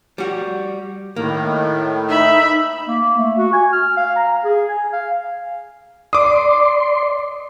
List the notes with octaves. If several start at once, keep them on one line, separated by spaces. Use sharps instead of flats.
G3 F#4
A2 D#3 A#3
D#4 E5 B5
A#3
A3
F#4
G#5
F6
F5
A#5
G#4
G#5
F5
D5 C6 D6 D#6